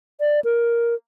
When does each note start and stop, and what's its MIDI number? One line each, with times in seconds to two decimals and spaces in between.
0.20 0.40 74
0.45 0.95 70